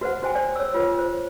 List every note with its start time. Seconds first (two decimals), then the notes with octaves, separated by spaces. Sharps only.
0.01 F#4 B4 C5 F#5
0.23 F#4 C5 G5 G#5
0.35 C5 D5 G#5
0.56 C#5 E6
0.74 F4 B4
0.99 C5